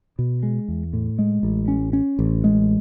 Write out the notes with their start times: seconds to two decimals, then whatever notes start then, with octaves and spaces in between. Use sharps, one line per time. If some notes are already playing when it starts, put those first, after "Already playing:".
0.19 B2
0.43 G#3
0.68 E2
0.93 A2
1.19 G#3
1.43 A1
1.68 C#4
1.93 C#4
2.19 A1
2.44 G#3